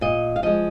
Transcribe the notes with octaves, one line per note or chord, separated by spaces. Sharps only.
A#2 D#5
F5
F3 G#3 D#5